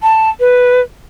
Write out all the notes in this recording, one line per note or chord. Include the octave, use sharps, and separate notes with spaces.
A5
B4